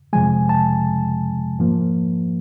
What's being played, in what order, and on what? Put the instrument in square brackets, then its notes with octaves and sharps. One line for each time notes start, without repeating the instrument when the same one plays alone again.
[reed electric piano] F2 C3 F3 G#3 G#5
A5
G#2 F3 A#3